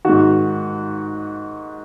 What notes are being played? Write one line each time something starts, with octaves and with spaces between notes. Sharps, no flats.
G#2 D#3 F#4